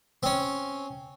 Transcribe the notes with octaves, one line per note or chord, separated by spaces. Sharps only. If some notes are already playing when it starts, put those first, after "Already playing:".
C4 C#4